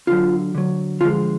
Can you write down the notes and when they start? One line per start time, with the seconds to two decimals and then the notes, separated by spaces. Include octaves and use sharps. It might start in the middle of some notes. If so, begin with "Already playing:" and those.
0.07 D3 F#3 F4
0.55 D3 F#3
1.01 D3 F3 G#3 F4